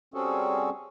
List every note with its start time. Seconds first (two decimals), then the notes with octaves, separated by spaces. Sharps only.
0.14 G3 C4 C#4 F#4 G#4 A4